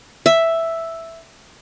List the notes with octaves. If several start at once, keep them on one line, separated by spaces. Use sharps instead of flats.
E5